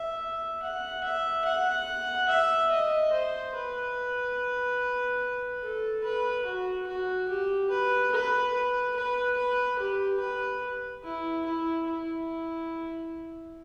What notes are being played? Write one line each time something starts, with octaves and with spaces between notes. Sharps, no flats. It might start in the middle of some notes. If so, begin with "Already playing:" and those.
Already playing: E5
F#5
E5
F#5
E5
D#5
C5
B4
A4
B4
F#4
F#4
G4
B4
B4
B4
B4
B4
G4
B4
E4
E4
E4